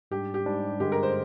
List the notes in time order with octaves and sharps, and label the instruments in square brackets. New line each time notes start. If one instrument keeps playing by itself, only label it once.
[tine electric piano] G#2 G3 D4 [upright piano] G4
[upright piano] G4
[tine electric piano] G#2 G3 D4
[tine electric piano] G2 D3 G#3 [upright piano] G4
[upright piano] A#4
C5